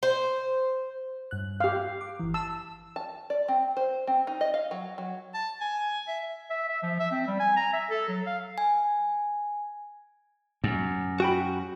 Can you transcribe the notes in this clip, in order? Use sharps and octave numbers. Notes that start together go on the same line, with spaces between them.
C5
G2 F#6
G4 F5
D6
G1 E3
A5 E6
A5
D5
C4
C5
C4
D#4
D#5
F5
F#3
F#3
A5
G#5
E5
E5
E5
F3
E5
C4
G3
G#5
A#5
E5
A4
F#3
F5
G#5
F#2
F#4 G5 B5